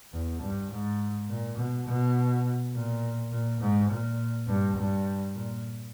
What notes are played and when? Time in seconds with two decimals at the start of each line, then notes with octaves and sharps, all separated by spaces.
0.13 E2
0.41 G2
0.70 G#2
1.28 A#2
1.57 B2
1.86 B2
2.74 A#2
3.32 A#2
3.61 G#2
3.90 A#2
4.48 G2
4.76 G2
5.34 A#2